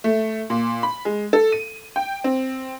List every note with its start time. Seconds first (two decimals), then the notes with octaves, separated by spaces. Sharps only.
0.04 A3
0.50 A#2
0.83 B5
1.05 G#3
1.33 A4
1.52 D#7
1.96 G5
2.24 C4